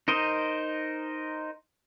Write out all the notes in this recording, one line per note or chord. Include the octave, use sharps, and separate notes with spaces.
D#4 A#4 C5 D#5